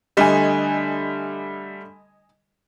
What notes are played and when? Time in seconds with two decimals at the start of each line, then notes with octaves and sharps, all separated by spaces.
0.17 D3 G3 A3 D#5 G#5